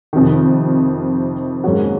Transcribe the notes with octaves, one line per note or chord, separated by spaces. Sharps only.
F2 C3 D#3
G#2 F#3 A#3 C#4 F#4